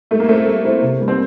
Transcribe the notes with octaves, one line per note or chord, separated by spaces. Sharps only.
G3 A3
A#3
A3 C4 E4 A4 C5
G3
C4 E4 A4 C5
C3
G3 A#3
C4